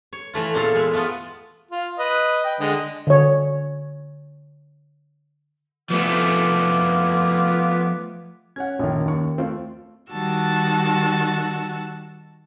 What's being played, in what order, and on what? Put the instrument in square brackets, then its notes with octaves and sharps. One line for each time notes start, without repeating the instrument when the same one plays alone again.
[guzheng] C#5
E3 A3 F4
E2 A#2 E4 F4 A4 F5
G#3 E5
A3 B3 F4
[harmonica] F4
B4 D#5
G5
D3 G#3 D#5
[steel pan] D3 C#5
[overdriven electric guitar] F3 A3 [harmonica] B3 F4 D6
[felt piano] C#4 C#5 F#5 [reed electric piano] G#6
[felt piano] A#1 D#3 [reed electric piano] C#4
[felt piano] D#2 C#6
[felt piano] A3 [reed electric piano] C4 F4
[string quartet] D#3 G3 F#4 A5 E6